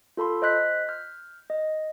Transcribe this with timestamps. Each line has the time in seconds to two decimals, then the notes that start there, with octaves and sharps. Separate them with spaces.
0.17 F4 A4 B5 C6
0.42 C5 D#5 C6 F#6 G6 B6
0.89 F6 G6
1.50 D#5